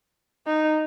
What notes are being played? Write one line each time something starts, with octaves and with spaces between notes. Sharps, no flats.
D#4